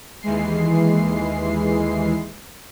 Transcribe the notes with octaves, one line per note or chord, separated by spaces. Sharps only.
D#2 E3 G#3 C7